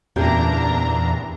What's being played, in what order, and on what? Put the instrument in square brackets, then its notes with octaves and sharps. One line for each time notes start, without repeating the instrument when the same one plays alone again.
[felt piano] F#1 G4 G6 [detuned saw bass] E2 [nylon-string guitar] A#2 G#4 [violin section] D4 A#5